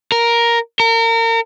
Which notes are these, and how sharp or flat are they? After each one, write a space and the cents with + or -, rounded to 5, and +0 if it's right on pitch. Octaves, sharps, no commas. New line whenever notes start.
A#4 +5
A#4 -35